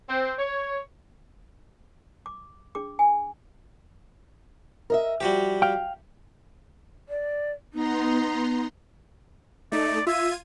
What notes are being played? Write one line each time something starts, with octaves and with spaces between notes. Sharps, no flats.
C4
C#5
D6
D4 G#4 D6
G#5
A#4 D#5 E5
F3 G3 F#4 G4
F5 G5
D5
B3 D#4 A#5 C6
A3 D#4 D5
F4 E5 G#6 D#7